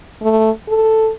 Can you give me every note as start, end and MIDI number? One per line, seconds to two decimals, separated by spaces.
0.22 0.50 57
0.68 1.11 69